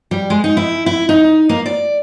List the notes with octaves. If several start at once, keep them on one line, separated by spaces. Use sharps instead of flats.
G3
G#3
D#4
E4
E4
D#4
A#3
D5